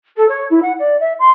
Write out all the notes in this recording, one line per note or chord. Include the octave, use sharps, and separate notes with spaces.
A4
C#5
E4
F#5
D5
E5
C6